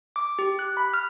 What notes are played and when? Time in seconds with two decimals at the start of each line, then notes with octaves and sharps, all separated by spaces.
0.16 D6
0.39 G4
0.59 F#6
0.77 B5
0.94 F6